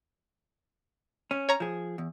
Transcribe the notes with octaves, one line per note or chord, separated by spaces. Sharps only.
C#4
C#5 A#5
F3 G#4
E2